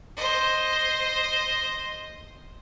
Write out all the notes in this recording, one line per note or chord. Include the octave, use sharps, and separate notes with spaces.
C5 D#5